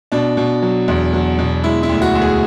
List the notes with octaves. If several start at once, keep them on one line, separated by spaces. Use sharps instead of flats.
B2 D4
B2
F#3
E2
F#3
B2
G#3 E4
E4
D2
F#4
D2
G#4